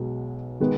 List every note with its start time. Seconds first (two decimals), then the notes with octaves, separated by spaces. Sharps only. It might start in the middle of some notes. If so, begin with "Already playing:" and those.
Already playing: B1 B2 G#3
0.60 D#3 G#3 B3